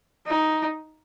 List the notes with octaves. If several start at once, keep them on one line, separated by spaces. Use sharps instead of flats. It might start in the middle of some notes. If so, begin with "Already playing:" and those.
D#4